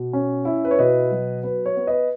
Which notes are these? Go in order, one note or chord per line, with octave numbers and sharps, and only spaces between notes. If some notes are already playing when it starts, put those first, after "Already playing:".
Already playing: B2
C#4
E4
B4
C#5
B2 B4 D#5
F#3
B3 B4
C#5
B3
B4 D#5